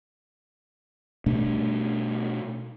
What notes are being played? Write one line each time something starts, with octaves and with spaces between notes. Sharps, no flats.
B2 A3 D4